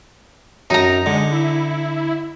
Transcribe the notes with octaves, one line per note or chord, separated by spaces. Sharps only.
F#2 D#4 A#5
D3 G#3
E4